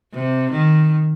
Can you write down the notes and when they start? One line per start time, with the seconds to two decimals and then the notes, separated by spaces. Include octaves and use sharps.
0.14 C3
0.52 D#3